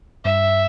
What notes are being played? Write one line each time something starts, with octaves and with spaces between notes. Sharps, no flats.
G2 E5